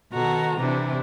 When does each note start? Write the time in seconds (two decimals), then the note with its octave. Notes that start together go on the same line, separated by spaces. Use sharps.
0.11 B2 D#3 F#4 A4 A#5
0.56 C3 E3 D4 E4